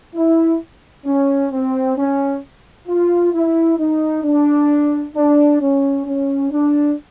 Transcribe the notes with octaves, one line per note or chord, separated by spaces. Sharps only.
E4
C#4
C4
C#4
F4
E4
D#4
D4
D4
C#4
C#4
D4